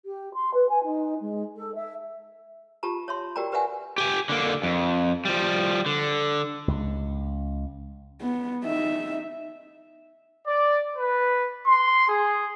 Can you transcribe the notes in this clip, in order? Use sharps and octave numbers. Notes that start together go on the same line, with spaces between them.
G4
C6
B4
G#5
D#4
G#3
A4
E5
F4 G4 A5 A#5
C#5 E5 C6
F#4 G4 A#4 D5 G5 A#5
G4 B4 D5 E5 F#5 G#5
G4 G#5
D3 A#3
F2
F3 G3
D3
C#2
B3
D#4 E5
D5
B4
C6
G#4